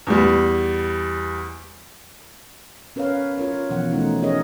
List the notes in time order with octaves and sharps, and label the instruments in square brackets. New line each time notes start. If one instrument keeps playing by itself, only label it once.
[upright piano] E2 G3
[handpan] C#4 A#4 B4 C#5 F5
F4 A#4 C#5
B2 E3 F3 F4 F#5
E3 A3 C#4 D#4
C#4 D#4 G#4 A#4 C#5 D#5